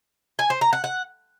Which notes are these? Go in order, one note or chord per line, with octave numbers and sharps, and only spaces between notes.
G#5
C5
A#5
F#5
F#5